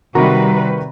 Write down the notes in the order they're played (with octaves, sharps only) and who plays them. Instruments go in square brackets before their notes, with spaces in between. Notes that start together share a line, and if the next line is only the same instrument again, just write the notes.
[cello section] C3 G3 B4 [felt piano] D#3 F#4 A#5